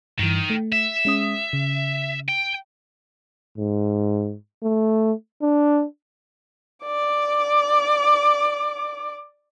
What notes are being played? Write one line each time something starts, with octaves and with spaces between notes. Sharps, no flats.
G2 D#3 E3
A3
E5
G#3 C#4 D#6
C#3
G5
G#2
A3
D4
D5 D6